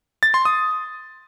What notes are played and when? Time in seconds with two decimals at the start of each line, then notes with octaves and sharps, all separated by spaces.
0.23 A6
0.34 C6
0.45 D#6